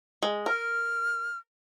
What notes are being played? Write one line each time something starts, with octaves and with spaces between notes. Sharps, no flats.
G#3
A#4 F6